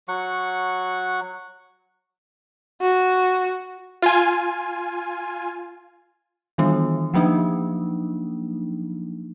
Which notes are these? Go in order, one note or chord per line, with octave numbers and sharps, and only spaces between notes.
F#3 F#5 C#6
F#4
F4 G#5
D#3 E3 G3 B3 D4
F3 F#3 A#3 D4 D#4